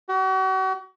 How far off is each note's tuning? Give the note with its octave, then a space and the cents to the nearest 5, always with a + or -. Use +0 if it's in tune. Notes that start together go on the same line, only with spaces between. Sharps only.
F#4 +40